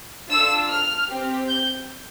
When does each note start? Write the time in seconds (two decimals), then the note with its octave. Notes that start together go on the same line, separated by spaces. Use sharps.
0.30 D4 F4 A4 E6
0.69 F6
1.08 C4 G4
1.47 G6